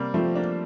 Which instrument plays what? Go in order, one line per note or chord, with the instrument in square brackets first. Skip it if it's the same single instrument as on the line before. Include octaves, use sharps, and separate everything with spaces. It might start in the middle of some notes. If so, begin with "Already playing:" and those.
Already playing: [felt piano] C3 [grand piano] G3 A#3
[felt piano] F3 [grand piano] A3 C4
[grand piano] A#3 D4